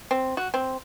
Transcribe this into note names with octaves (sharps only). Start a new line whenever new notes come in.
C4
F#4
C4